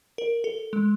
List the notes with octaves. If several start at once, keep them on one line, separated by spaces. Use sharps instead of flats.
A#4
A4
G#3